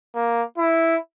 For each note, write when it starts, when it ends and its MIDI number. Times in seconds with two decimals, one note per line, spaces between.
0.15 0.43 58
0.58 0.97 64